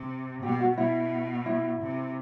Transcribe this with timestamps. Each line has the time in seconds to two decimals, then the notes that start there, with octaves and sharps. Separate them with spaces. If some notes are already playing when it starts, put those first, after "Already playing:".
Already playing: C3
0.42 B2 G4
0.60 F#4
0.78 B2 E4
1.46 E4
1.81 C3